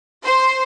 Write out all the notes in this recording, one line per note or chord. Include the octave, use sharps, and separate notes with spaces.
C5